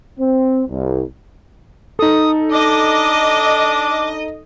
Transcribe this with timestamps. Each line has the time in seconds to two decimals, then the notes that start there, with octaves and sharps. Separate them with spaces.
0.19 C4
0.69 C2
1.99 D#4 A4 D#6
2.52 D4 D#5 D6